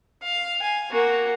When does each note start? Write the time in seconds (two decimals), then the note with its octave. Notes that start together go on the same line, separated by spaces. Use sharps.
0.23 F5
0.62 G#5
0.91 A#3 F#4